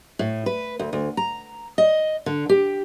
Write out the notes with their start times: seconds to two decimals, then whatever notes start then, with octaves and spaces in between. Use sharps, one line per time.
0.19 A2
0.46 B4
0.79 D2
0.93 D2
1.17 A#5
1.78 D#5
2.26 D3
2.49 G4